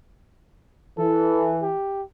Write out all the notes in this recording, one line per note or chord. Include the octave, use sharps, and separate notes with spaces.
E3 A4
G4